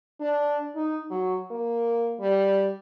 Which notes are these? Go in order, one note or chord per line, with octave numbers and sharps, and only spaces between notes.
D4
D#4
F#3
A#3
G3